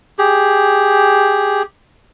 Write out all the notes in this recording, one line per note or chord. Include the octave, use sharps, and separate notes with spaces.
G4 G#4